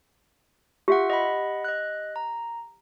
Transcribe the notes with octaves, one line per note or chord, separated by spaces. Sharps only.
F4 G4 E5 F#5
D#5 F#5 B5
D#5 F#6
A#5